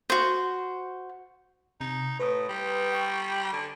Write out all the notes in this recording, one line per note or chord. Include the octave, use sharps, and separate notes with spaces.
F#4 C5
C3 D#4
A2 B4 D#6
G3
G5 C#6
D3